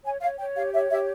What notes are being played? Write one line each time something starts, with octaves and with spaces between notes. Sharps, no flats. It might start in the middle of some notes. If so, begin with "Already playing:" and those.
C#5 G#5
C#5 F5
C#5 G5
G4 F5
C#5 E5
G4 E5